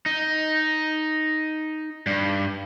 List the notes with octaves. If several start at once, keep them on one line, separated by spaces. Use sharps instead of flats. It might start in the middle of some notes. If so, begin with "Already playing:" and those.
D#4
G2